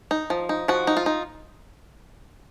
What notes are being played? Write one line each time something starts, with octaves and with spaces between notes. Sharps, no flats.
D#4
F3
D#4
F3 F#4
D#4
F4
D#4